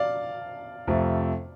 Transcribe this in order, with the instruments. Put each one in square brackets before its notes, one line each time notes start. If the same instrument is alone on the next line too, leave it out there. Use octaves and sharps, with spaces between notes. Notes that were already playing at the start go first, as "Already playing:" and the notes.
Already playing: [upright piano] D5 F5
[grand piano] F2 C3 A3